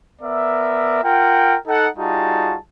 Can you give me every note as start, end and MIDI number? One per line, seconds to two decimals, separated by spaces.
0.22 1.03 59
0.22 1.03 70
0.22 1.03 74
0.22 1.03 76
1.04 1.56 65
1.04 1.56 70
1.04 1.56 78
1.04 1.56 79
1.67 1.88 63
1.67 1.88 69
1.67 1.88 78
1.98 2.56 55
1.98 2.56 63
1.98 2.56 65
1.98 2.56 66
1.98 2.56 68
1.98 2.56 81